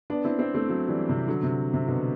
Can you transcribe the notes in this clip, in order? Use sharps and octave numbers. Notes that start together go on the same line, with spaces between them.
B3 D4
C4 E4
C4 E4
A3 C4
F#3 A3
E3 G3
C3
D3 F#3
C3
C3
B2 D3